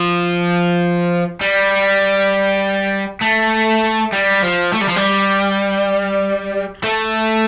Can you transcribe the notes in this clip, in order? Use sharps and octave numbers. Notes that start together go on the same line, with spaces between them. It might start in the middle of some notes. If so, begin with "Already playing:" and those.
Already playing: F3
G3
A3
G3
F3
A3
G3
F3
G3
A3